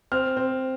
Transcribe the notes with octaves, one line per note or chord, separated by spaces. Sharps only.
C4 F6
C4